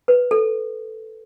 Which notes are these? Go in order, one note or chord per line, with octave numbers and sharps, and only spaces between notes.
B4
A4